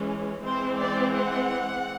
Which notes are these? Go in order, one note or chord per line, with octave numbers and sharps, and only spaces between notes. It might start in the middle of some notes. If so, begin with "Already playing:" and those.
Already playing: E3 G#3 C#4
E3 G#3 C4 C5
D5
F#5